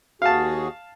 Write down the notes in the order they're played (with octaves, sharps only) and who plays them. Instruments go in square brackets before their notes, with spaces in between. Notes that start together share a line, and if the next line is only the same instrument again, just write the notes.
[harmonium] D#2 F#4 G#4 [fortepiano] F5 A5